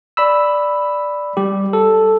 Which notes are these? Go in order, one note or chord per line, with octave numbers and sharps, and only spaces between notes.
D5 B5 E6
G3 G4
A4